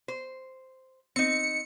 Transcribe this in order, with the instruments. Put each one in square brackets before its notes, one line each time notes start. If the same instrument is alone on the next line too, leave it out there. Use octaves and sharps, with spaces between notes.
[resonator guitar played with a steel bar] C5
[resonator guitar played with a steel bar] C4 D#4 [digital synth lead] C#7